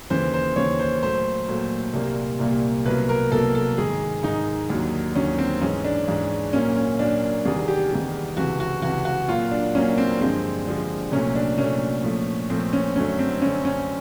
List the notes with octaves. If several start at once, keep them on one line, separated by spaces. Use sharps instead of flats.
D#2 C#3 E3 C5
C5
D#2 C#3 E3 C#5
C5
A#2 F#3 A3 C5
A#2 F#3 A3
C2 A#2 G3 A#3
C2 A#2 G3 A#3
C2 B2 F#3 A#3 B4
A#4
C2 B2 F#3 A#3 A4
A4
G#2 D#3 G#3 G#4
G#2 D#3 G#3 D#4
D#2 D3 F#3
D#2 D3 F#3 C#4
C4
G#2 E3 G#3 C#4
D4
G#2 E3 G#3
A#2 F#3 A#3 C#4
C#4
A#2 F#3 A#3 D4
E2 C3 D#3 G3 G#4
G4
E2 C3 D#3 G3
C#2 C3 E3 F#4
F#4
C#2 C3 E3 F#4
F#4
A#2 F#3 A#3 F4
D4
A#2 F#3 A#3 C#4
C4
G2 D3 F3 G#3 C4
G2 D3 F3 G#3
C2 A#2 F#3 A3 C#4
D4
C2 A#2 F#3 A3 C#4
A#2 F3 A3
A#2 F3 A3 C4
C#4
F#2 D3 F#3 A3 C#4
C4
F#2 D3 F#3 A3 C#4
C#4